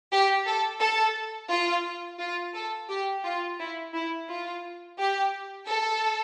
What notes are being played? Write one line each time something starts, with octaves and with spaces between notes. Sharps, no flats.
G4
A4
A4
F4
F4
A4
G4
F4
E4
E4
F4
G4
A4